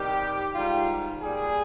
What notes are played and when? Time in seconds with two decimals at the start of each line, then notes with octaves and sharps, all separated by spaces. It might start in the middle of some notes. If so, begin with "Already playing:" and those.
Already playing: C3 D#3 G3 G4
0.55 G#2 D#3 G3 F4
1.22 A#2 G3 G#4